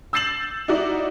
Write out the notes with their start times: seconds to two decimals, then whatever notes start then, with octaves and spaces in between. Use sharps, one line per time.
0.13 E6 G6 A6 C7 E7 F#7
0.68 D#4 E4 F#4 D5